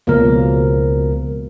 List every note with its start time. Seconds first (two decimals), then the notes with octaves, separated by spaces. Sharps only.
0.07 C#2 B2 F3 A#3 A#4